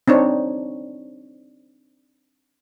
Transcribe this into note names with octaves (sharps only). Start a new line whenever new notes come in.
C4 D4 D#4 C#5